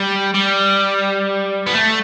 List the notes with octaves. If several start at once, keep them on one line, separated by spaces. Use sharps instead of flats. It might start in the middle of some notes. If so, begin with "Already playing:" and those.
Already playing: G3
G3
B3
A3